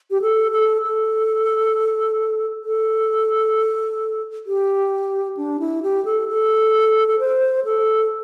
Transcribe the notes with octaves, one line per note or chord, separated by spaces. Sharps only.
G4
A4
A4
A4
A4
G4
D4
E4
G4
A4
A4
A4
C5
A4